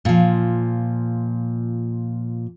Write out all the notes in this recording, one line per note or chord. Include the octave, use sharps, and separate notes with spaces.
A#2 F3